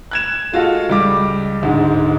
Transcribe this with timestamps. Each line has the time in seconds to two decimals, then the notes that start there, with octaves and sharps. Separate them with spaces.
0.11 F#6 G#6 E7
0.53 G#3 F4 F#4 A4 F5
0.90 C#2 G3 D6
1.62 D1 D2 G#2